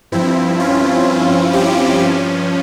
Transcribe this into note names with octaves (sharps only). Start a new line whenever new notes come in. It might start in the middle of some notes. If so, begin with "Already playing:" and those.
G2 F3 C4 E4
C#4 F4
E4 G4
G2 F3 C#4